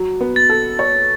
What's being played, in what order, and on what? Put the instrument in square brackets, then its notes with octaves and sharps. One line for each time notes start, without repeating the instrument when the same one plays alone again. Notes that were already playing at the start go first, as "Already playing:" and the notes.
Already playing: [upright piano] F#3
B3
[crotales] A6
[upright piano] A4
C#5